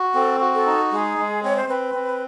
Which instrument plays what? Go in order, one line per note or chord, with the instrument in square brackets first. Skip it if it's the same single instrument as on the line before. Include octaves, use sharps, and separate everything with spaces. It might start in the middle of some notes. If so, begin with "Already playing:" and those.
Already playing: [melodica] F#4
[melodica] C4 [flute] A4
[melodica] F#4
[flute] A4
[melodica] D#4
[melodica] G#3 [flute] G#4
[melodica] G#3
[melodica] C4 [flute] C#5
[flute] C5
[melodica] C4 [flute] B4
[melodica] C4